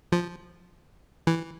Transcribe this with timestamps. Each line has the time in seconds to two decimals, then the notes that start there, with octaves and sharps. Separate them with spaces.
0.12 F3
1.27 E3